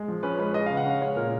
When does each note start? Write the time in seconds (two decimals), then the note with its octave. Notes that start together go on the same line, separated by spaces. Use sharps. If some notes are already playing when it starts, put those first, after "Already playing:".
Already playing: G#3
0.08 F3
0.23 C#4 B4
0.39 G#3 B4
0.54 G#3 D#5
0.66 F5
0.70 C#3
0.77 F#5
0.86 C#4 F5
1.02 G#3 C#5
1.16 A#2 A#4